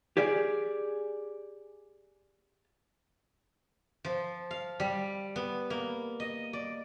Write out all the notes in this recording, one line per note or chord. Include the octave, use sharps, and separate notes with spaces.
G4 G#4 D5
F3
F5
G3
B3
A#3
D#5
D5